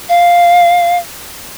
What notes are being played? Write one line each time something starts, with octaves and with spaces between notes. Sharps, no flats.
F5